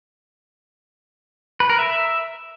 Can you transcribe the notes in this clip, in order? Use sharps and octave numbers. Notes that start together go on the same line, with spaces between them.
B4
A#4
E5